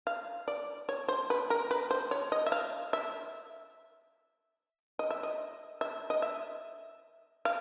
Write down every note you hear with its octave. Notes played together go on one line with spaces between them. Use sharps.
F5
D5
C#5
C5
B4
A#4
B4
C5
C#5
D#5
E5
F5
E5
D#5
E5
D#5
E5
D#5
E5
F5